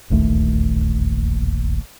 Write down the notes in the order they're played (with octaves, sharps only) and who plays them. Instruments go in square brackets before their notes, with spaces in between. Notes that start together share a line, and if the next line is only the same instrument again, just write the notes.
[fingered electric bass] E1 A#1 D#2 A3